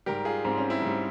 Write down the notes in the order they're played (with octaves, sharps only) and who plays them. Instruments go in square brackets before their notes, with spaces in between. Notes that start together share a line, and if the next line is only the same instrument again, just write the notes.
[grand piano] G#2 G3 G4 A#4
F4 G#4
G#2 G3 C4
C#4
C4 E4
G#2 G3